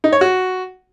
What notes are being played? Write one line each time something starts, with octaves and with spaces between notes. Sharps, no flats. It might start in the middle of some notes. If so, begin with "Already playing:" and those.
D#4
C#5
F#4